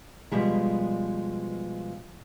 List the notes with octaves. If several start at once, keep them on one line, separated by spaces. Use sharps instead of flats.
B2 F3 G3 G#3